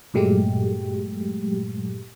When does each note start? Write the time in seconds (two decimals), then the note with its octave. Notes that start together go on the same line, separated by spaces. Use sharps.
0.14 G2 A#2 F#3 G#3 A3 G4